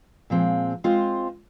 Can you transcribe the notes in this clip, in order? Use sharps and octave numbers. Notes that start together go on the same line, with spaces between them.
A#2 F3 G#3 C4
G#3 C4 F4 C5 F5